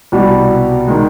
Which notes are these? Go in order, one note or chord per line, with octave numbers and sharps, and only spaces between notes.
C2 B2 G3
D#3 G#3